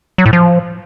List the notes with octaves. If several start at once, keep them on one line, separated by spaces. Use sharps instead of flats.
F#3
A2
F3